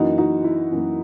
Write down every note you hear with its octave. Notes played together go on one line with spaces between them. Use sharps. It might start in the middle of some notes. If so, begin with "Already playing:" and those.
Already playing: F#2 E3 A#3 D#4 F#4
D#4 F#4
E4
F#2 E3 A#3